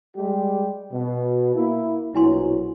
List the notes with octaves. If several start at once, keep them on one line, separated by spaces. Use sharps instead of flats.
G3 G#3 G4
B2
A#3 E4
A#1 B2 F#3 E4 G#5 C6